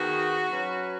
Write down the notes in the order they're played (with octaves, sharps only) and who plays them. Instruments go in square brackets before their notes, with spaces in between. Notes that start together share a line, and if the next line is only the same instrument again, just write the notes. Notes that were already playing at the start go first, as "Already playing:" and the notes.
Already playing: [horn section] D#3 B3 G#4 [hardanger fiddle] F#4
[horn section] F#3 C#4 B4